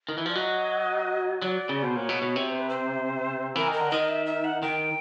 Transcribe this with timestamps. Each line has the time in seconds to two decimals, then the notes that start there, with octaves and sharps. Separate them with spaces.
0.09 D#3
0.18 E3
0.26 F3 D5
0.35 F#3 D#5
1.42 F#3 D5
1.69 C#3
1.82 B2 C5
1.95 A#2 C#5
2.09 B2
2.22 B2
2.36 C3
2.49 C5
2.59 B4
2.70 C5
3.55 E3 A#4
3.68 D#3
3.73 A#4
3.80 D3
3.91 D#3 D#5
4.09 E5
4.26 E5
4.44 F#5
4.62 D#3 G5